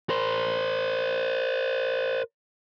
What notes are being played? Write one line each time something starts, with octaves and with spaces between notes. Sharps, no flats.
A#4 C5